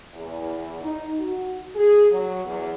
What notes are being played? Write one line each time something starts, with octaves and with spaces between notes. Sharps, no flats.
E2
D#4
F#4
G#4
F#3
E2